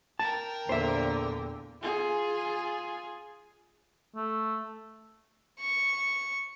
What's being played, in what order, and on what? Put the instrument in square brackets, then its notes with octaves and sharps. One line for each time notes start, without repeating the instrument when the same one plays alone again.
[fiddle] A#4 G5 [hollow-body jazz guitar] A5
[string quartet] E2 A#2 D3 [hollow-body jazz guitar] C5 E5
[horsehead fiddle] F4 G#4
[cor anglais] A3
[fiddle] C#6